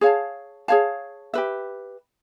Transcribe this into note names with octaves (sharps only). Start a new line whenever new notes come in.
G#4 C#5 F5 A5
G#4 C#5 F5 A5
G4 B4 E5